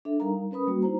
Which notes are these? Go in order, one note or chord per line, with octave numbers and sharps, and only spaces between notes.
D4 A4 E5
G3 D#4 A#4 F5 A#5
C#4 A#4 B4 B5 D#6
G3 A#3 F#4
D#4 E4 C5 A#5